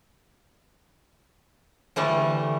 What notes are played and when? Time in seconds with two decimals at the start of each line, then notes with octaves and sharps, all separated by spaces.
1.96 D3 E3 G3 A3